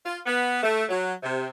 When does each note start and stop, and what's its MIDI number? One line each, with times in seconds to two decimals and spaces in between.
0.05 0.19 65
0.26 0.62 59
0.62 0.84 57
0.89 1.12 54
1.22 1.48 48